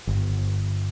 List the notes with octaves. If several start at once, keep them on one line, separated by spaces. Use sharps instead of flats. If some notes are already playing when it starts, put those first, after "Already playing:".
G1